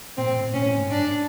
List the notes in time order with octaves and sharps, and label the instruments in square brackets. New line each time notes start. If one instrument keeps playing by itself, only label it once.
[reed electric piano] A#2 [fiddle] C4
[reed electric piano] A2
A2
[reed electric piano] A#2 [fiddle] C#4
[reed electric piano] A2
G#2
[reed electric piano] G2 [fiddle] D4
[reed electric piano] G#2